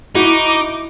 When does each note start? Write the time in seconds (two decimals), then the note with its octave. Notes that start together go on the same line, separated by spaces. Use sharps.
0.15 D#4 E4 F#4 D6